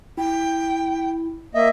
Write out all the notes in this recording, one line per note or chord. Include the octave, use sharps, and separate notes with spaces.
E4 G5
A#3 D#5 E5